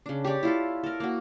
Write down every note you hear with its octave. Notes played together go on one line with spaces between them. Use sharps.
C#3 D4
G4 C#5 D5
E4 F4 A4
A4 A#4
A#3 F#4